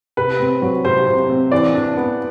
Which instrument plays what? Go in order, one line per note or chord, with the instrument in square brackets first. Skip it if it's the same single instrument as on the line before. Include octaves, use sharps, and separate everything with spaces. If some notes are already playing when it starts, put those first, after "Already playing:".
[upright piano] C3 B4
C4
F#3
C3 C5
C3
C4
E3 D5
D4
B3